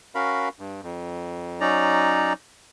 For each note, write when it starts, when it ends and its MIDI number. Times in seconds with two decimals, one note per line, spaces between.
0.15 0.49 61
0.15 0.49 66
0.15 0.49 70
0.15 0.49 77
0.15 0.49 83
0.59 0.81 43
0.83 1.60 41
1.61 2.33 54
1.61 2.33 61
1.61 2.33 63
1.61 2.33 74
1.61 2.33 82